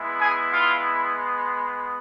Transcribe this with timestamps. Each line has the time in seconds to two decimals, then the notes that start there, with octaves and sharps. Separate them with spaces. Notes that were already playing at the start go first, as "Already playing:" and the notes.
Already playing: G#3 B3 E4
0.20 G#4 G#5
0.53 F4 F5